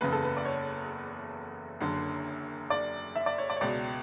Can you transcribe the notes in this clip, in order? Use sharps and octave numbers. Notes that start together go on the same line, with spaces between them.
F#1 E2 C#3 B4
A4
B4
D5
C#5
F#1 F#2 D3
D5
E5
D5
C#5
D5
C#5
C#2 B2 D5